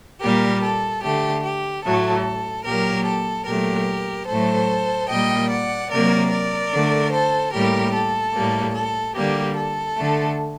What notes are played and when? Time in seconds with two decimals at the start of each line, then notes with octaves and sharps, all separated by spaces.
0.22 A#2 G3 A#3 G4 A#4
0.63 A4
1.04 D3 A3 G4
1.45 G4
1.85 A2 F#3 A3 A4
2.66 A#2 F#3 A#3 G4 A#4
3.07 A4
3.48 A#2 F#3 A3 G4 A#4
4.29 A2 F#3 A3 A4 C5
5.11 A#2 G3 A#3 D#5 G5
5.51 D5 F#5
5.91 C3 F#3 A#3 A#4 D5
6.32 A#4 D5
6.73 D3 A3
7.14 A4 C5
7.54 A2 G3 A#3 G4 A#4
7.94 A4
8.35 A2 G3 A#3
8.76 A4
9.16 D3 G3 A#3 G4
9.57 A4
9.97 D3 A3